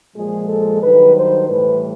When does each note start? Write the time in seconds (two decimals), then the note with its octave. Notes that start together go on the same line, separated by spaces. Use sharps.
0.15 A#2 F3 G#3 G#4
0.48 A4
0.82 G2 D#3 F#3 B4
1.15 C5
1.48 A2 E3 G3 B4